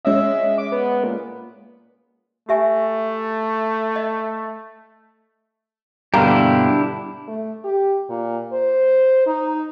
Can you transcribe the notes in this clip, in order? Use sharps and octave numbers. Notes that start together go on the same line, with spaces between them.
G#3 C#4 D#5 E5
D6
B3
A#2
A3 G4 E5 G#5
D#5
G2 B2 D3 A#3 D4 E4 G4
A3
G4
A#2
C5
D#4